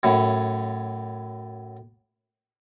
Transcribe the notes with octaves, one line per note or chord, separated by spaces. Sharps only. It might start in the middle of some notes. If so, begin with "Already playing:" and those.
F#2 A2